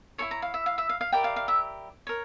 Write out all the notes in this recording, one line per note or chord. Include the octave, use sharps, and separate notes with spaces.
E4 A4 C#5 C#6
A#5
F5
E5
F5
E5
F5
F5
E4 G4 A#4 D5 G5
F5
F5
E5
A#4 C#5